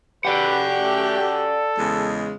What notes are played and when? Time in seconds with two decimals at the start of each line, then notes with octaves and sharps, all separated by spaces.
0.25 C#4 F#4 G4 B4 D5 F#5
0.81 A3
1.20 A4
1.77 E2 C#3 G#3